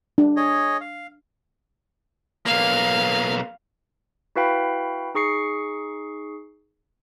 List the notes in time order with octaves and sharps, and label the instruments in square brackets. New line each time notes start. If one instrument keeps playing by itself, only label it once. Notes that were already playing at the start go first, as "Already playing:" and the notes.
[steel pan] D4
[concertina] G#4 C#5 D#5
F5
[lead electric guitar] B1 A#3 [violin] F5
[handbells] E4 F#4 B4 F5 G5 B5
D#4 G#4 C#6 C7 C#7